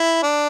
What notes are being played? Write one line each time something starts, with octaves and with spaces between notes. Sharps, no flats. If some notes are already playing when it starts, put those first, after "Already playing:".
Already playing: E4
D4